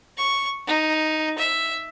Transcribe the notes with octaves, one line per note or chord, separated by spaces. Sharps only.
C#6
D#4
E5